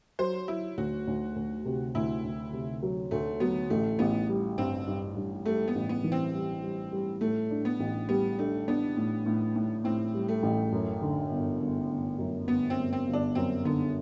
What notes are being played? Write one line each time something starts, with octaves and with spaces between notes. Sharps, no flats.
F#3 C5
F#3 E4
D2 F#4
D2
D2
C3
D2 E4
D2
C3
F#3
D2 A3
F#3 B3
A1 A3
A1 B3
G3
G2 C4
G2
G2
G3 A3
B3
A1
B3
E3
C4
G3
G3
G3
A2 A3
D4
B3
A1
G3 B3
A3 D4
B3 D4
A2
A2
A2
A2 C4
G3
A3
A1
F#2
D3
G1
G1
G1
F#2
G1 B3
C4
G1
C4
G1
D4
F#2 C4
D3 B3